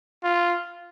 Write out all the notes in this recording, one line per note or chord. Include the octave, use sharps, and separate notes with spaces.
F4